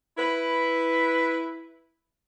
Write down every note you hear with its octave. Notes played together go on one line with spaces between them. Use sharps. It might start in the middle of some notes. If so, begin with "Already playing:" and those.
E4 B4